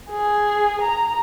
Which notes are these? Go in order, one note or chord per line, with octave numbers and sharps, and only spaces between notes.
G#4
A#5